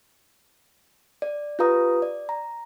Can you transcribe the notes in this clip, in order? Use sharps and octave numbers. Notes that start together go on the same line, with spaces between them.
D5
F4 G4 B4 F5 A#5 D#6
D5
A#5